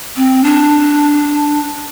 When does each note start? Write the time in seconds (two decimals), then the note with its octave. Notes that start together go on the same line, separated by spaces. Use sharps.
0.17 C4
0.44 D4